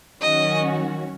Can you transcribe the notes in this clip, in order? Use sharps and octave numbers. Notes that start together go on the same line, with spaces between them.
D#3 F#3 C#4 F#4 D#5